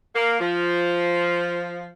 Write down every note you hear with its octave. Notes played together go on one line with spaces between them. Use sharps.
A#3
F3